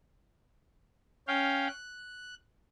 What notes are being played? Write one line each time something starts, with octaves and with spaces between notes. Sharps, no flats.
C#4 F5 G5
F#6